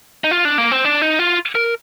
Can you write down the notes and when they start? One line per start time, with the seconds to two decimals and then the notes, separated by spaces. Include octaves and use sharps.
0.24 D#4
0.31 F4
0.45 D4
0.58 A#3
0.72 C4
0.85 D4
1.02 D#4
1.19 F4
1.55 A#4